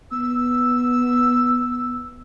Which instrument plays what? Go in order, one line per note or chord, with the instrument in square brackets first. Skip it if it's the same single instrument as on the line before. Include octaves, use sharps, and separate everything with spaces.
[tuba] B3 [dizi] E6